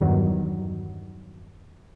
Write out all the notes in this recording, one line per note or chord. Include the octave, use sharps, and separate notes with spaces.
E2 G2 D#3 F#3